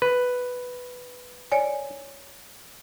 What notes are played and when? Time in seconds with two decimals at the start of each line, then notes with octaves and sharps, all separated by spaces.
0.02 B4
1.52 C#5 D5 G#5